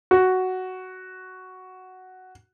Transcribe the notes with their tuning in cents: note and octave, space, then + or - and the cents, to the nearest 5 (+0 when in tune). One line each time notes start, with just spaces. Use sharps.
F#4 +5